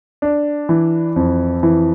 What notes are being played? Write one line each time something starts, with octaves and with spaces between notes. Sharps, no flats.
D4
E3
F2
E3